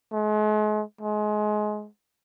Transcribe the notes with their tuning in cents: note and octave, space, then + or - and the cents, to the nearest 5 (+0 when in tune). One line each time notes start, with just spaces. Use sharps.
G#3 +40
G#3 +25